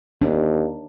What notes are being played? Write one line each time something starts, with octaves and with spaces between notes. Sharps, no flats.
D#2 D4